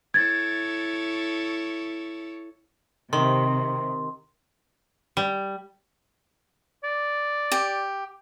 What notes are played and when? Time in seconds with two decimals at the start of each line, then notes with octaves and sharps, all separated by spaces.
0.14 E4 A4 C#5 G#6 A6
3.13 C3 D#3 C6
5.17 G3
6.84 D5
7.52 G4